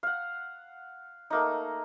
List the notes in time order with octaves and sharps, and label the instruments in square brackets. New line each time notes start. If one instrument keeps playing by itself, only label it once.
[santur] F5 F#5
A3 A#3 D#4